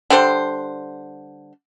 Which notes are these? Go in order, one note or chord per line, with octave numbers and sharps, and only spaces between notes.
D3 G3 C5